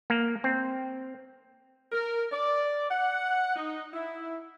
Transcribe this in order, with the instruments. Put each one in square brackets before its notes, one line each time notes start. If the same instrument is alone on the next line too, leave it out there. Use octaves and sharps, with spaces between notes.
[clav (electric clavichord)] A#3
C4
[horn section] A#4
D5
F#5
D#4
E4